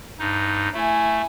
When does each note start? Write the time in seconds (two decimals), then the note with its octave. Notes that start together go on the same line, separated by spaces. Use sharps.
0.19 G2 D#4
0.74 A3 E4 G#5